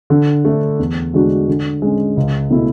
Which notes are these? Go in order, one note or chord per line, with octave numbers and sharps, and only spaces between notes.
D3
A3 D4
E2
D3 G#3 D4 F#4
D3
G#3 C#4
C#2
B2 A3 E4